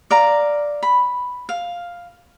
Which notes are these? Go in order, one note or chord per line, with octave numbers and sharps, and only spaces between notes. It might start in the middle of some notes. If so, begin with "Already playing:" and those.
D5 F5 A#5
B5
F5